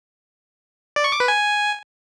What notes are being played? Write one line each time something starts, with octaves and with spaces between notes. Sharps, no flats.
D5
C#6
D6
B4
G#5